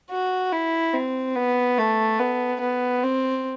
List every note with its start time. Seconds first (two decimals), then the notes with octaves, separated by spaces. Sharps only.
0.11 F#4
0.53 E4
0.93 C4
1.36 B3
1.78 A3
2.19 B3
2.61 B3
3.04 C4